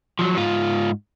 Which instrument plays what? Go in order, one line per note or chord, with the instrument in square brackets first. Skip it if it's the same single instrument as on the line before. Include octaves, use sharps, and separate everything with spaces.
[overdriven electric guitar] F3 F#3
G#2 F4